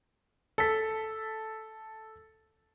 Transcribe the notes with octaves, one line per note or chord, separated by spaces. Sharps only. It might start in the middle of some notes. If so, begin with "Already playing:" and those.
A4 B6